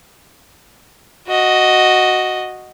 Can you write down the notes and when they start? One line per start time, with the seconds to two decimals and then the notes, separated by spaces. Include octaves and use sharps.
1.28 F#4 D#5